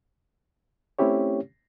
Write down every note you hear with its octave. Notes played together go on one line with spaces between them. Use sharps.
A3 C4 C#4 E4 G4 C#5